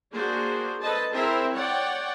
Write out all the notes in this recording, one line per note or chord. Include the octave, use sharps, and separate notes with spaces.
A#3 D4 F#4 G#4 C5
A4 B4 C5 D#5 A5
C4 E4 G#4 A#4 C5 E5
C#5 D5 F#5 G5